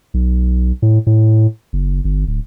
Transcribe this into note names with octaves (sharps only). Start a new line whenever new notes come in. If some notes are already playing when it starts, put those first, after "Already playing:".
B1
A2
A2
F#1
G1
D1